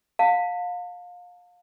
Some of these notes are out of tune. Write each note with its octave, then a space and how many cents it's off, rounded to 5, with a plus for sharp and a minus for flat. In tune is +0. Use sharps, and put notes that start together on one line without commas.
F5 +30 A5 +35